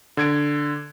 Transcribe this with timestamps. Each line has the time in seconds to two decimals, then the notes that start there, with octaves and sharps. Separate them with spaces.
0.17 D3 G#6 D7